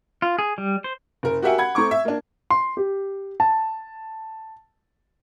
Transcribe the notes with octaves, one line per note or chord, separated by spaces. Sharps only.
F4
G#4
G3
C5
F#1 A#4
F#4 G4 A#4 E5 F#5 G#5
F#5 B5 G#6
A3 C4 A#5 C#6 D6
E5
A#3 D4
C6
G4
A5